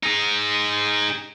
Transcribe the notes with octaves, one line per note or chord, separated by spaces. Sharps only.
D#4 G#4